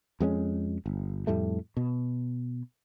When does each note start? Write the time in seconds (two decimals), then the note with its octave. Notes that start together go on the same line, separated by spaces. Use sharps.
0.20 F2 G#3 B3 C#4
0.86 G1
1.27 F2 A2 G3 A3
1.77 B2